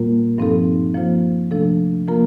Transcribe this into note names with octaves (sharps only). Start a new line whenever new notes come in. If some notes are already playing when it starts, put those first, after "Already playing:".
Already playing: A#2 G3 A#3 F4 A#4
G2 F3 C4 D#4 A4
F3 A#3 F4 C5
C3 F3 A3 D4 A4
F3 A#3 F4 A#4